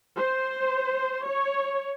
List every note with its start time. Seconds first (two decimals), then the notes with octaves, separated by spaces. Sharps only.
0.17 C5
1.25 C#5